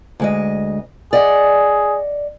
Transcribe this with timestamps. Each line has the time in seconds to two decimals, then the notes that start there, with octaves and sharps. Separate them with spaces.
0.20 D2 G#3 D#5
1.13 G#4 D5 D#5 F#5